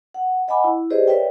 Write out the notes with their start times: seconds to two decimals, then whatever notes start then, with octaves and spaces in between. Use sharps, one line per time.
0.14 F#5
0.48 D#5 F#5 G#5 B5 D6
0.64 E4
0.90 G4 G#4 B4 C5 D5 D#5
1.08 A#4 B4 C#5 D5 E5 G5